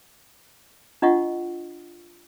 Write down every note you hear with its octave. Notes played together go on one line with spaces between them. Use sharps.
D4 F4 D#5 F#5 C#6